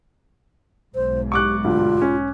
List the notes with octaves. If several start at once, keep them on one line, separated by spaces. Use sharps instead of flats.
B1 G#2 C5
G4 C#6 D6 F#6
D2 G2 F4
C#4